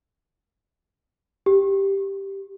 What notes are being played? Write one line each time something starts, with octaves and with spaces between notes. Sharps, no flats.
G4